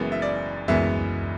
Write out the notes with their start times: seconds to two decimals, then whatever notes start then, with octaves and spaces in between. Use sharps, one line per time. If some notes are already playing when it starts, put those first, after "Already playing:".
Already playing: F#1 F#2 E3 G#3 B3
0.12 E5
0.22 D5
0.68 F#1 F#2 E3 G#3 B3 E5